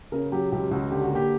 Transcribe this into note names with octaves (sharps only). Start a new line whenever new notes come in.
C#3 A#4
F#3 G4
C#2 G4
C#2 F#4
D3 G4
F#4
A#3 G4